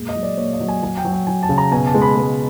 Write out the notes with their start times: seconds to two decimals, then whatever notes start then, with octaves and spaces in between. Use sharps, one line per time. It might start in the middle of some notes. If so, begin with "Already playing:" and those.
Already playing: A#2 G#3
0.09 D#5
0.16 F#3
0.23 D5
0.37 A#2 C#5
0.53 D#5
0.60 F#3
0.68 G#5
0.83 F#3 G#5
0.97 G5
1.05 F#3
1.13 G5
1.27 F#3 G#5
1.43 A5
1.49 C#3
1.58 A#5
1.72 B2 G#5
1.87 A5
1.94 G#3
2.02 B5
2.16 G#3